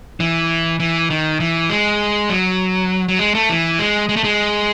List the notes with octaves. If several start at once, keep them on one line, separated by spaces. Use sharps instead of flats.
E3
E3
D#3
E3
G#3
F#3
F#3
G#3
A3
E3
G#3
G#3
A3
G#3